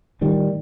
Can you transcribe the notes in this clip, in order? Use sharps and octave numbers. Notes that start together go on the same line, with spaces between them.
A2 D#3 G3